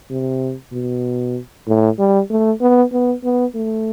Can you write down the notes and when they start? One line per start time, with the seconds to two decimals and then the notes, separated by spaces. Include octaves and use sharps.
0.10 C3
0.73 B2
1.67 A2
1.99 G3
2.30 A3
2.61 B3
2.92 B3
3.24 B3
3.55 A3